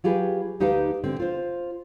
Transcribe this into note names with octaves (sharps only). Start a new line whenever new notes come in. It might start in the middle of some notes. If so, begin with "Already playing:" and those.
F#3 F4 G4 G#4 B4
D2 D#4 G4 B4 F5 A5
D3 C4
F4 C5